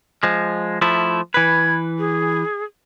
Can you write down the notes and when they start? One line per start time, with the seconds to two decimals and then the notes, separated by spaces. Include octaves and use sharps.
0.23 F3 G#3
0.82 F3 A3 E4
1.34 E3 B4 G#6
1.99 G#4